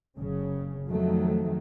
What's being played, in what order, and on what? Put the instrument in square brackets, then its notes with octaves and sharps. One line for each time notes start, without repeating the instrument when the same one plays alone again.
[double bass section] F#1 C#3
F2 D#3 F#3 A3